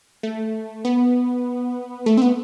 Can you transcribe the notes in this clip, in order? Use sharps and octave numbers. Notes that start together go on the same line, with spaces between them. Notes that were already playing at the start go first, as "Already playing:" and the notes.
A3
B3
A3
C4
B3